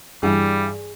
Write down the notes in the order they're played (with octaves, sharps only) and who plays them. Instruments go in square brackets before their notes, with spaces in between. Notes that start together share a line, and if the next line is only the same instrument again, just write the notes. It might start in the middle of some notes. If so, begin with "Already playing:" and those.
[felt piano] G2 E3 [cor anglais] G3 [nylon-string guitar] G#4